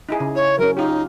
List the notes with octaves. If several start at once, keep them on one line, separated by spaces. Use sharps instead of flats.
D#4 E4 G#4
C#3
E4 C#5
F#3 C#4 A#4
D#4 F4 G4